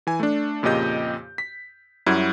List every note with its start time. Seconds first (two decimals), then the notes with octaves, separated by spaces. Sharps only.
0.07 E3 G#5
0.20 A3 D4
0.63 F2 A#2 C#3 G4 D#5 G6
1.38 B6
2.06 F#2 G3 E4 F#4 G#6